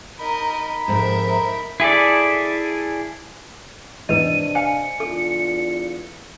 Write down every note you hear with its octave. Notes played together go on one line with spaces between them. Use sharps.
D#4 A#4 D#5 B5
F2 G#2 A#4 E5
E4 G#4 A4 D5
E2 G#2 C3 D#3 D4 B4 D#5 D#7
F5 G#5 C#7
E2 D4 F4 A4